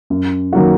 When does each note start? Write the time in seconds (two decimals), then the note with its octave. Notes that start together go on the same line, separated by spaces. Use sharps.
0.10 F#2
0.53 D#3 F#3 A#3 F#4